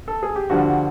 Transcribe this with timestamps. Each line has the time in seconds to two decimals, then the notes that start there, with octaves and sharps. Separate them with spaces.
0.08 A4
0.23 G#4
0.36 G4
0.50 G2 D3 F3 F#4